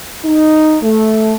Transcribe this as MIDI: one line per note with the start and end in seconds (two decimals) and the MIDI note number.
0.24 0.77 63
0.82 1.34 57